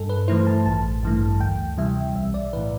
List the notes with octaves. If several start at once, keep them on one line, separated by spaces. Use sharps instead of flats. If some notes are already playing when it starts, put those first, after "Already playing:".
Already playing: G2 A4
B4
E3 A3 E4 C5
A5
A1 A5
G2 E3 A3
D2 G5
C3 E3 G3 E5
B1 E5
D5
A2 E3 B4